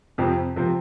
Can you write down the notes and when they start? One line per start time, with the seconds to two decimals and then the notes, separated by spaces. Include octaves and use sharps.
0.18 F2 C3 F3 C4
0.56 C3 F3 C4